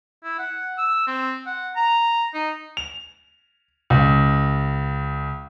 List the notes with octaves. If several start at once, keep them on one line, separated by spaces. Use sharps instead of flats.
E4
F#5
E6
C4
F#5
A#5
D#4
F7
C#2